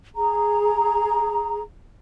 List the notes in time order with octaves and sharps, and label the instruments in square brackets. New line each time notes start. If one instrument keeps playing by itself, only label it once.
[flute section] G#4 A#5